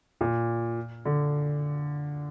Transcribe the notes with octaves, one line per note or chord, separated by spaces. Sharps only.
A#2
D3